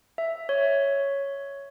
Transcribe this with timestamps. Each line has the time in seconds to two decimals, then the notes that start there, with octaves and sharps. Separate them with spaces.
0.18 E5
0.49 C#5